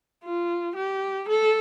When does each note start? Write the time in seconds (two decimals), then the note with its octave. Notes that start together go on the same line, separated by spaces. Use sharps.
0.24 F4
0.76 G4
1.29 A4